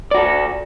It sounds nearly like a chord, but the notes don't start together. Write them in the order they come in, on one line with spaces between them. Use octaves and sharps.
D5 F#4 A4